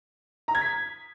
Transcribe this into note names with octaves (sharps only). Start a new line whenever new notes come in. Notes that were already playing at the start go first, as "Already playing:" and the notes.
A#5
G#6
B6